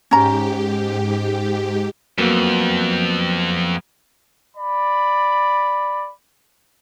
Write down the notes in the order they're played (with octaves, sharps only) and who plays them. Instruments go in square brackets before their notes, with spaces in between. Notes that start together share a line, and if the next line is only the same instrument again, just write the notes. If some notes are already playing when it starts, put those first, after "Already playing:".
[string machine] G#2 G4 [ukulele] C#4 A#5
[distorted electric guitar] F2 [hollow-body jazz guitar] F#3 A#3 B3
[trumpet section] D5 B5